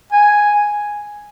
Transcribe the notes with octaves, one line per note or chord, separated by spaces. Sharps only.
G#5